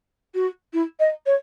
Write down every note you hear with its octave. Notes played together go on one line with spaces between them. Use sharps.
F#4
E4
D#5
C#5